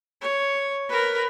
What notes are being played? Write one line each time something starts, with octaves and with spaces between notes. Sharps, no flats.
C#5
A#4 B4